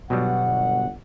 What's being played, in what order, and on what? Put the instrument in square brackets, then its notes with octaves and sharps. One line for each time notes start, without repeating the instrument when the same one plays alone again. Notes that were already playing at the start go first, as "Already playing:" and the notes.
[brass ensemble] G1 F#5 [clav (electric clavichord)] B2 F#3 G3